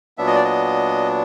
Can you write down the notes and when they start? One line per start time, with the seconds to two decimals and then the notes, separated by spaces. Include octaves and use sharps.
0.18 A#2 F#3 B3 D4 E5
0.27 D#5
0.35 D5
0.44 D#5